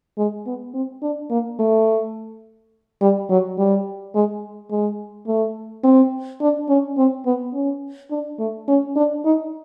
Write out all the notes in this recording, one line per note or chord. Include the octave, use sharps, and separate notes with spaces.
G#3
B3
C4
D4
A#3
A3
G3
F#3
G3
G#3
G#3
A3
C4
D4
C#4
C4
B3
C#4
D4
A3
C#4
D4
D#4